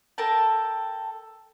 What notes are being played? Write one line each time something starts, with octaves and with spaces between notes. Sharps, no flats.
A4 A#4 G5 A5